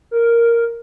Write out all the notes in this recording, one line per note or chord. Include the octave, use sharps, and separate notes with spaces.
A#4